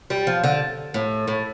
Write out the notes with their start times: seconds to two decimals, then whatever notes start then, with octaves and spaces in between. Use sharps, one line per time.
0.10 G3
0.27 F3
0.44 D3
0.94 A2
1.28 A2